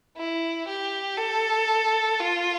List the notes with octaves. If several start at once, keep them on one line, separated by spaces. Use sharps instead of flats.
E4
G4
A4
F4